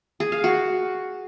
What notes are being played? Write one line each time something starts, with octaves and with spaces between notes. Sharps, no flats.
G#4
F5
F#4